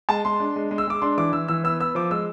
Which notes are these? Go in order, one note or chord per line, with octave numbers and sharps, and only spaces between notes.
G#3 A5
G#3 C6
D4
G#3
G#3
E6
G#3 D6
D4 C6
E3 D6
E3 E6
E3 E6
B3 E6
B3 E6
F3 D6
G#3 E6